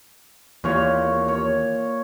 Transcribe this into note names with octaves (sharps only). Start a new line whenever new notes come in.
D#2 A#2 E3 C#5
C#5